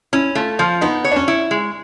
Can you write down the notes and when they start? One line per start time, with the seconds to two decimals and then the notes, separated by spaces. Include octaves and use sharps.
0.13 C#4 E4
0.35 A3 F4
0.59 F3 F4
0.81 B3 D#4
1.05 C#5
1.12 D4
1.16 C#4
1.28 E4
1.51 G#3